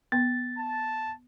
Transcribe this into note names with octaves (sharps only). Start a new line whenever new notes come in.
B3 A6
A5